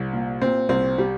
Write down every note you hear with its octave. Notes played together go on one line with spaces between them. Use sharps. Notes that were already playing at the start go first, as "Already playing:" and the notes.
Already playing: C2
A#2
A#2 C4
C2 C4
G3